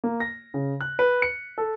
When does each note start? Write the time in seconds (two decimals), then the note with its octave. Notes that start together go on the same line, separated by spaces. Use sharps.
0.04 A#3
0.20 A#6
0.54 C#3
0.81 F#6
0.99 B4
1.22 C#7
1.58 A4